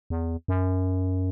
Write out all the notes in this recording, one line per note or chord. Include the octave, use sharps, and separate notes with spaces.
E2
F#2